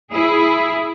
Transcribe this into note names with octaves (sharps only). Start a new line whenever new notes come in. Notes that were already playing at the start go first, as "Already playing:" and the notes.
E4 G#4